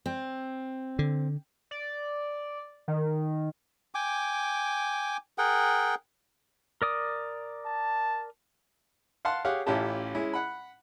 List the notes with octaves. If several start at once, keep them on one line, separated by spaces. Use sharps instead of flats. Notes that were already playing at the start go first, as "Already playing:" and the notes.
C4
D3
D5
D#3
G5 G#5 D6
G#4 A#4 F#5 G5
A#4 D5 D#6
A5
F5 F#5 A5 C6
G4 G#4 C#5 F5 F#5
A1 C#4 E4 F4 G4 A5
G#3 C#4 E4
F#5 B5